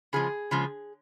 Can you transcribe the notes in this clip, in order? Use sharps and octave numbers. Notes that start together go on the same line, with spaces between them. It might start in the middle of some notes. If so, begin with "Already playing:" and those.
C#3 F3 G#3 G#4
C#3 F3 G#3